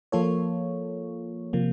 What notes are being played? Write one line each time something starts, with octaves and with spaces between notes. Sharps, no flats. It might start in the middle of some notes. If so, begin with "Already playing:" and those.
F3 A#3 F4 A4 C#5
C3 F3 A#3